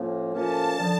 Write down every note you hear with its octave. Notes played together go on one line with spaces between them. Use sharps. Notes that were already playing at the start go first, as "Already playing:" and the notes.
Already playing: A2 F3 A#3 C#4
A2 F3 A#3 C#4 A5
D3 F3